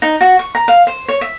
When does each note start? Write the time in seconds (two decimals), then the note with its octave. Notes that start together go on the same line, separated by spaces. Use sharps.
0.02 D#4
0.21 F#4
0.39 C#6
0.55 A#5
0.68 F5
0.87 C5
1.08 C#5
1.21 E5